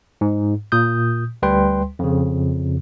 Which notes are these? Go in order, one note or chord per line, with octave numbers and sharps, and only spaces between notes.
G#2
A#2 D#6 G6
D2 G3 B4 G5 C6
F2 C#3